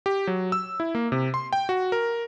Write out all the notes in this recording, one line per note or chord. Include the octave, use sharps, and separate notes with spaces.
G4
F#3
E6
E4
A#3
C3
C6
G5
F#4
A#4